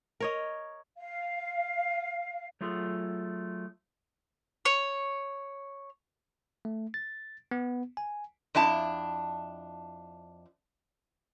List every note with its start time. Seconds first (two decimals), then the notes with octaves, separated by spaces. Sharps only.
0.20 A#4 C#5 D#5
0.98 F5
2.61 F#3 A3 F4 G#4
4.65 C#5 C#6
6.65 A3
6.94 A6
7.51 B3
7.97 G#5
8.55 F2 D4 E4 A5